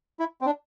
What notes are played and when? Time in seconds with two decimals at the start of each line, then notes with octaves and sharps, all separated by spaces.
0.19 E4
0.41 C4
0.46 D4